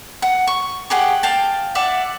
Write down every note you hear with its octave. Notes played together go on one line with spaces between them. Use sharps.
F#5
C#6
G4 G#4 F#5 G5
F5 G5 A5
D5 E5 F#5